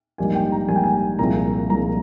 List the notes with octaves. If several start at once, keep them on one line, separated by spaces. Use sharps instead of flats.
A#1 G#2 G3 A#3 G#5
G5
A#5
A#1 G#2 G3 A#3 G#5
G5
G#5
C2 A#2 F3 G#3 A#5
C2 A#2 F3 G#3 A#5